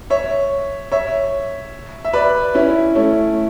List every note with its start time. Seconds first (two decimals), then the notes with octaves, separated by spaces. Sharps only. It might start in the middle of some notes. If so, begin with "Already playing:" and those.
0.10 C#5 E5
0.92 C#5 E5
2.05 E5
2.13 B4 D5
2.54 C#4 E4
2.95 A3 C#4